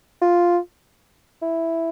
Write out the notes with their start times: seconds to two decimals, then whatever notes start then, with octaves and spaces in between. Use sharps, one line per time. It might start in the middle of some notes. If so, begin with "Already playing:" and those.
0.22 F4
1.42 E4